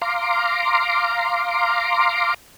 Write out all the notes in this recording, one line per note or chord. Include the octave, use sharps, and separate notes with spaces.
F5 A#5 C6 D6